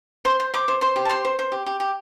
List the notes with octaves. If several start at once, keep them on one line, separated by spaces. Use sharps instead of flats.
C5 C6
C5
C5 D6
C5
C5 C6
G4
A5
C5 C6
C5
C5
G4
G4
G4